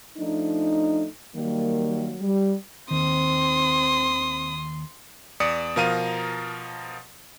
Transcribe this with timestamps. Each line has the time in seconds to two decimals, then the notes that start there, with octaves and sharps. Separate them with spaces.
0.18 F3 A3 D4 D#4
1.35 D#3 F#3 G3 A#3
2.21 G3
2.91 D#2 D#3 C4 C6 D#6
5.40 E2 D5 D#6 C#7
5.76 B2 F3 A#4 F5 A#5 D#7